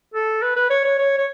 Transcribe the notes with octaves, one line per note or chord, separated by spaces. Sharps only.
A4
B4
B4
C#5
C#5
C#5
C#5